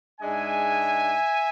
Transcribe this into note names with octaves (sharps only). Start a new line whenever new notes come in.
G#2 G#3 D4 E5 G#5